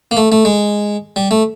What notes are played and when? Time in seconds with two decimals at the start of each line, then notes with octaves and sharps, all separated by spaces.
0.11 A#3
0.17 A3
0.32 A3
0.45 G#3
1.16 G3
1.31 A3